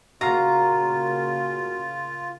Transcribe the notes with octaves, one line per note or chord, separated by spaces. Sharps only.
C#3 A#3 F4 F#4 F5 A#5